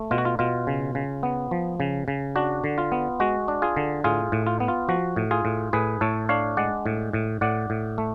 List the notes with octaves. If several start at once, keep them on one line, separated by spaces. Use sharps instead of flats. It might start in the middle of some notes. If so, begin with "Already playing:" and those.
Already playing: A3
B2 F4
F#4
F4
B2 F4
C#3
C#3
B3
F3
C#3
C#3
D4 F#4
D3
F4
B3
G#3 F#4
D4
F4 G#4
D3
A2 F4 G#4
A2
F4
B3
F4
F3 F#4
A2
F4 G#4
A2
A2 G#4 B4
A2 A4 C#5
D4 C#5 F5
G#3 D5 F#5
A2
A2
A2 D5 F#5
A2
A3